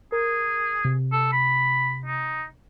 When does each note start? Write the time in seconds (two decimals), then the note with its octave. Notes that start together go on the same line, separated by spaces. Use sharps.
0.12 G#4 A#4
0.85 C3
1.12 A4
1.32 B5
2.05 D#4